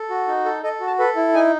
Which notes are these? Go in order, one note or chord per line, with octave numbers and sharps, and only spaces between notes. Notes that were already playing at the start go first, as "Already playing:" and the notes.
Already playing: A4
F#4
D#4
A4
A4 D#5
F#4
A5
A4 B4
E4
D#4 G#5